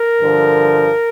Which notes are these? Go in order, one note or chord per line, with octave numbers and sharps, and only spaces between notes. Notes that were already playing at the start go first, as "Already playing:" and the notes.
Already playing: A#4
G2 D3 F3